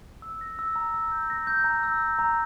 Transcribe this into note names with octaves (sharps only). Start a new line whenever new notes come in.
E6
A#6
E6
A#5
E6
G6
A#6
G6
A#5
E6
E6
A#5